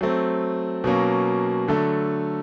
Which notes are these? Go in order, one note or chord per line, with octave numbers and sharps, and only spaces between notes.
F#3 A3 C4
B2 F#3 A#3 C#4
D3 F#3 A3